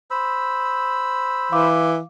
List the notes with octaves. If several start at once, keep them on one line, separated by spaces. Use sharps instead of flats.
C5 B5 E6
E3 F5 D6